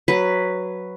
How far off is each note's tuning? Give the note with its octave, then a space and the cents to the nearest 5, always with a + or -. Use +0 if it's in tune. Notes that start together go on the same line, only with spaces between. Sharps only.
F#3 +0 B4 +0